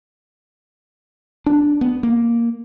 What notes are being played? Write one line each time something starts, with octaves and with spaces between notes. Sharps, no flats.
D4
B3
A#3